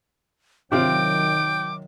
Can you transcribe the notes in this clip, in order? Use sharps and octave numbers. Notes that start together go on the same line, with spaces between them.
C3 D#3 F#3 C4 F4 G5 D6